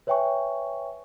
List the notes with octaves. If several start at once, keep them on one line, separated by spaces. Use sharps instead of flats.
B4 C#5 E5 G5 G#5 C#6